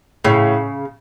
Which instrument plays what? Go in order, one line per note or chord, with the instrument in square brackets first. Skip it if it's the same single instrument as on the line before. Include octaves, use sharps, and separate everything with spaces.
[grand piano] A2 [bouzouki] C#3